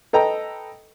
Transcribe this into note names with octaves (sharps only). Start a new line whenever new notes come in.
A4 B4 D#5 G5 A#5